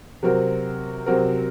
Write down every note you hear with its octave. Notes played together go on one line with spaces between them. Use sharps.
C3 F#3 C4 F#4 A#4
C3 F#3 C4 F#4 A#4